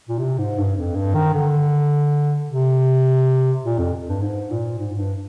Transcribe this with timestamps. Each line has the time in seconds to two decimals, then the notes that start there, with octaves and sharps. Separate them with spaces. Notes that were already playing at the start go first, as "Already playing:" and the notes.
0.09 A#2
0.19 C3
0.38 G#2
0.58 G2
0.77 F2
0.96 G2
1.14 D#3
1.34 D3
2.49 C3
3.64 A#2
3.79 F2
4.07 G2
4.22 G#2
4.51 A#2
4.79 G#2
4.92 G#2
4.98 G2